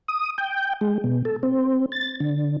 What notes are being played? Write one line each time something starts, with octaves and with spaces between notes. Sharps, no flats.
D#6
G5
G#3
B2
A4
C4
A6
D3